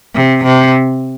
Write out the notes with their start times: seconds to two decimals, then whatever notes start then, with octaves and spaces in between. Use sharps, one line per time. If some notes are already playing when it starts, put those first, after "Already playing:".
0.15 C3
0.43 C3